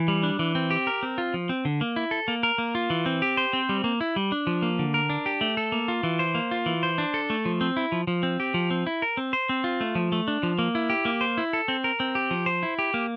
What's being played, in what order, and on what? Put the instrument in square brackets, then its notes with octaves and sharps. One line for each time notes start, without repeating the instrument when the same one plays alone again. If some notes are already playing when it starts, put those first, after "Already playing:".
Already playing: [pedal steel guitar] E3
G3
D4
E3
C4
G4
A#4
C4
F4
F3
C4
D3
A#3
E4
A4
A#3
A#4
A#3
F4
E3
C4
G4
C5
C4
G3
A#3
E4
G3
D4
F3
A#3
D3
A#4
D4
G4
A3
A4
A#3
F4
E3
C5
A#3
F4
E3
C5
D4
A4
A3
F3
C4
E4
F3
F3
C4
G4
F3
C4
E4
A#4
C4
C5
C4
F4
A3
F3
A3
D4
F3
A#3
E4
G4
A#3
C5
E4
A4
C4
A#4
C4
G4
F3
C5
E4
G4
A#3